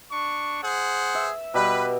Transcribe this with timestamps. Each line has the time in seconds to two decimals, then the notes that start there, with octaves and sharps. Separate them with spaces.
0.11 D4 C#6
0.62 G#4 C5 F#5
1.15 E5
1.54 B2 G3 B4